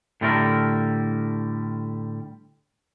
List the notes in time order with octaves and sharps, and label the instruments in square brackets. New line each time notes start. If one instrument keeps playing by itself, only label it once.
[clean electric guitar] A2 D3 G3 A3 A#4